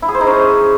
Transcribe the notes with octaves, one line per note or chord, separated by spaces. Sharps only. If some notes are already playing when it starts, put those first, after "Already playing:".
E4
G#4
C5
D#4
C#4